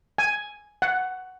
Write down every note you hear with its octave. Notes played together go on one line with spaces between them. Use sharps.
G#5
F#5